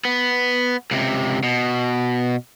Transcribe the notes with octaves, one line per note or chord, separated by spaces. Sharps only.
B3
C#2 C3
B2